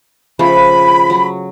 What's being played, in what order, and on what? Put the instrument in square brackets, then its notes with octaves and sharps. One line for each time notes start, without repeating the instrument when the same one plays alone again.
[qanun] C#3 F3 A3 [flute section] B5
[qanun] F#3